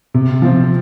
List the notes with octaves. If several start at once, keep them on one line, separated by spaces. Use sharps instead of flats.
C3
F3 C4